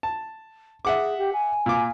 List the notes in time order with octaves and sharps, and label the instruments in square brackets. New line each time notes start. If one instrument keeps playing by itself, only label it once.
[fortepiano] A5
[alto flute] G#4 [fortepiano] E5 F#5 D6
[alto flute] G4
G#5
[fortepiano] A#2 D6